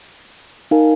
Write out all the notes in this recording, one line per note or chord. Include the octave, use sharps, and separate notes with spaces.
D#4 A#4 F5 G#5